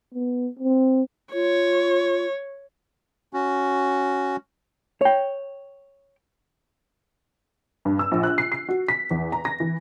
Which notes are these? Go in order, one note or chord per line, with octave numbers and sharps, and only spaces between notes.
B3
C4
F4 C#5
C#4 F#4
C#5 G5
G2
E6
A#1
F#6
C7
C7
F#4
B6
E2
A#5
A#6
E3